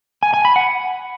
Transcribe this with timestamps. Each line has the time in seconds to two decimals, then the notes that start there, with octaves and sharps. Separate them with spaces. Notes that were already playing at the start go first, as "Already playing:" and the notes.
0.23 G#5
0.34 G#5
0.45 B5
0.56 F#5